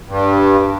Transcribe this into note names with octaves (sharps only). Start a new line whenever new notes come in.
G2